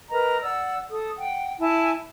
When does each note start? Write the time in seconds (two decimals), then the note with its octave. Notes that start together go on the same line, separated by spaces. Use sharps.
0.11 A#4 B4 D#5 A#5
0.42 D5 F#5 E6
0.91 A4 D#6
1.16 F#5 G5
1.59 E4 G#5 A5